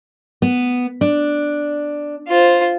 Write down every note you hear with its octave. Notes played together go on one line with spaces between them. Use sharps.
B3
D4
F4 C5